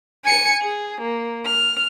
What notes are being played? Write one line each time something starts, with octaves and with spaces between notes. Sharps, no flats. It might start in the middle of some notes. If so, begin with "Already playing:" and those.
G#5 C#7
G#4
A#3
F6